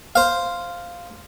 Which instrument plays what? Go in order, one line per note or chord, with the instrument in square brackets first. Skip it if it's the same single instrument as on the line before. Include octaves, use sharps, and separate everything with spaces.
[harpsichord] C5 F5